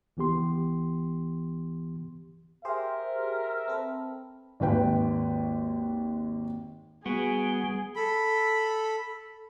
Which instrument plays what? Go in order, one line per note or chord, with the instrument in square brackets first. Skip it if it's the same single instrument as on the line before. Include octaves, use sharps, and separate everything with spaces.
[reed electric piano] C#2 E3 B3 G4 C6
[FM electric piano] G4 G#4 C5 [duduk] A#4 [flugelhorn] E5
[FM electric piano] C4 A4 B4
[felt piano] G#1 D#2 B4 G5
[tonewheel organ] G3 [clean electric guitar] B3 F#4 [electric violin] G#4
[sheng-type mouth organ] A4 B5